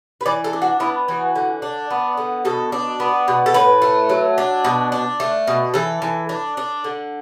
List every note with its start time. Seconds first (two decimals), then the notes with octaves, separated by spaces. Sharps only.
0.21 B4
0.25 E3 D5
0.44 A4
0.53 D4
0.62 F#4
0.80 B3 E4
1.08 E3 F#4
1.35 D3
1.62 D4
1.90 B3
2.18 D3
2.45 B2 A4
2.72 D4
3.00 B3
3.28 B2
3.46 A4
3.54 A2 B4
3.82 A3
4.09 F#3
4.38 D4
4.65 B2
4.92 D4
5.20 A3
5.47 B2
5.74 E3 A4
6.02 E3
6.29 D4
6.57 D4
6.84 D3